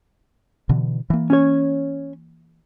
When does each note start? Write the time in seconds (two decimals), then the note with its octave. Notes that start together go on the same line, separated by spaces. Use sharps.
0.69 B2 D3 E3
1.10 E3 A#3
1.30 C#4 C#5